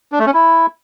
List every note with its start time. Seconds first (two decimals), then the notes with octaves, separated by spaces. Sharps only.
0.12 D4
0.19 A3
0.27 C#4
0.34 E4